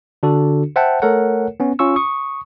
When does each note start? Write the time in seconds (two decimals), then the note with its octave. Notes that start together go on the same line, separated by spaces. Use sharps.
0.23 D3 D4 F#4 A4
0.76 C5 E5 F#5 G5 A5
1.02 A3 A4 A#4 C#5 F#5
1.60 B3 C#4
1.79 C#4 F4 C#6 E6
1.96 C#6 D#6